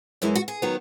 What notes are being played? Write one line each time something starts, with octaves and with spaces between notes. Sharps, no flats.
F#2 E3 G#3 E4
F#4
G#4
D#3 F#3 B3